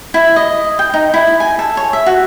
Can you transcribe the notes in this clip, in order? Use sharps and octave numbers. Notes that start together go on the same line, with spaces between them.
E4
D#5
G5
D#4
E4
G#5
A4
C#5
E5
F#4